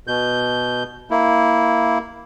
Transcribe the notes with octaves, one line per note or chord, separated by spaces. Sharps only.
B2 G6
A#3 E4